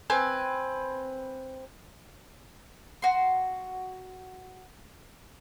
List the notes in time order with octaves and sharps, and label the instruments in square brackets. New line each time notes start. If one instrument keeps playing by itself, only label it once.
[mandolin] C4 B4 G#5
F#4 C6